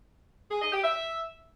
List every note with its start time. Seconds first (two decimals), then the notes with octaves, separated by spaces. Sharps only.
0.51 G#4
0.62 D#5
0.72 G4
0.83 E5